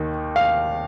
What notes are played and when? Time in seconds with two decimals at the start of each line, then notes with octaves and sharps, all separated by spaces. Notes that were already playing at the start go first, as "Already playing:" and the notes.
Already playing: D#2 D#3
0.36 F5